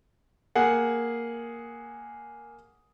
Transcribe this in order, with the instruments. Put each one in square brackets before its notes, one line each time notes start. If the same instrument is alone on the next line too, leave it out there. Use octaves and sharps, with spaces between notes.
[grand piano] A#3 G#4 F#5